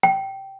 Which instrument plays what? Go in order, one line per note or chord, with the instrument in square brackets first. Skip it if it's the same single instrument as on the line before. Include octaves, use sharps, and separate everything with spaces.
[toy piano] G5